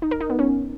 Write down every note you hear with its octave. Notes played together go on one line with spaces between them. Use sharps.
D#4
A#4
D#4
B3
C#4